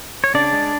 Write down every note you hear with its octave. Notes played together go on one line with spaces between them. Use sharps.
C#5
C#3 D4 D5
G#3